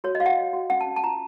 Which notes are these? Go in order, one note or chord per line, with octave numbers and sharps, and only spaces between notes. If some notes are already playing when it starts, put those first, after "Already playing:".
F#4 C#5
D#5
F#4 F5
F#5
F#4
F#4
C#4 F#5
A5
C#4
A5
F4 A#5